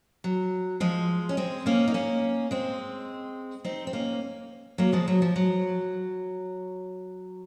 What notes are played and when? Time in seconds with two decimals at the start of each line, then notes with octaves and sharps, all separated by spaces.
0.24 F#3
0.80 F3 G#3
1.29 C#4
1.37 G#3 C4
1.66 A#3 C#4
1.88 D#4
1.94 A#3 C#4
2.51 G#3 C4
3.65 C4 D#4
3.87 C4
3.93 A#3 C#4
4.78 F#3 A#3
4.92 F3 G#3
5.08 F#3
5.22 F3
5.36 F#3